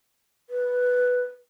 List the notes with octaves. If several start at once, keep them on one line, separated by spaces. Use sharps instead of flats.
B4